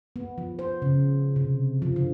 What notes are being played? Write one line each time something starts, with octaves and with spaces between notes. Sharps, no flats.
B3
F3
C5
C#3
C3
F3
D3